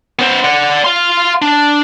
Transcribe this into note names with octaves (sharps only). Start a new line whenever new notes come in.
B3 C5
D5 F#5
F5 C6
D4